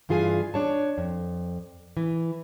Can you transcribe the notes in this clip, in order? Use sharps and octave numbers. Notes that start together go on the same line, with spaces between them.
G2 E3 F4 G#4 B4 G#5
D4 C#5 A5
F2
E3